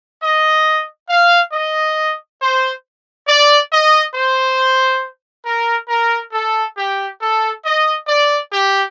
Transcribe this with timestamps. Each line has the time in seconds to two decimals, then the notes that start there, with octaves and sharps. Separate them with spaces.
0.21 D#5
1.09 F5
1.53 D#5
2.40 C5
3.27 D5
3.72 D#5
4.15 C5
5.46 A#4
5.89 A#4
6.33 A4
6.77 G4
7.21 A4
7.64 D#5
8.07 D5
8.52 G4